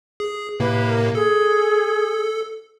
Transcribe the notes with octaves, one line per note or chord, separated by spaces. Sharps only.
G#4
A2 C3 A#3 B4
A#4
G#4 A4